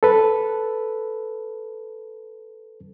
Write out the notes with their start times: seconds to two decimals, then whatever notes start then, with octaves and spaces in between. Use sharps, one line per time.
0.03 A4 B4